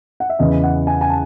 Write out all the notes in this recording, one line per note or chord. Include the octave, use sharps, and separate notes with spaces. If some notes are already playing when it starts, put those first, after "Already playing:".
F#5
E5
E2 C#3 E3 D#5
F#5
G#5
G#5
A5